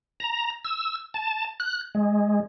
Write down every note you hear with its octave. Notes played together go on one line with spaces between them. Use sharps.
A#5
E6
A5
F#6
G#3